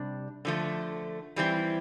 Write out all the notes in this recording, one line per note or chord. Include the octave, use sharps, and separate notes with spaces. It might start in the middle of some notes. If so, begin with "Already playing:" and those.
Already playing: C3 G3 D4
D3 F3 A3
E3 G3 C4 E4